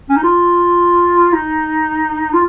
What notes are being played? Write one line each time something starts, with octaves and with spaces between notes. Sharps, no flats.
C#4
D#4
F4
D#4
F4